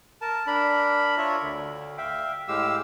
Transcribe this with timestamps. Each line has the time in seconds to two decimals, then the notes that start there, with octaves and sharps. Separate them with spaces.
0.21 A#4 A5
0.47 D4 A#4 B5
1.18 D4 F4 C#5 E5
1.42 D2 D3
1.98 E5 F5 G5
2.48 A2 G#3 G4 F5 E6